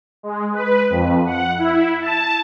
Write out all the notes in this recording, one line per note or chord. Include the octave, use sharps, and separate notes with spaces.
G#3
B4
F2
F#5
E4
A5